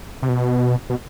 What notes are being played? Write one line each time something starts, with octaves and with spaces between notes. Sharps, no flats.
C3
B2
B2